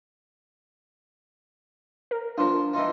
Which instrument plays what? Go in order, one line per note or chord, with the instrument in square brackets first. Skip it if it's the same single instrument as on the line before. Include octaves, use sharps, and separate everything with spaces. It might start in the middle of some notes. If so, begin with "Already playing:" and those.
[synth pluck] A#4
[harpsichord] F3 F4 [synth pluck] D4 A#4
[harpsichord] E3 D#4 F4